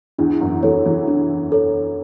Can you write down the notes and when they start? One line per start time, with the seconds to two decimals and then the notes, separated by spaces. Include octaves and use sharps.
0.18 E2 E3 D4
0.41 F#2 F#3
0.63 E2 E3 A4 C#5
0.86 E2 E3
1.07 D4
1.52 A4 C#5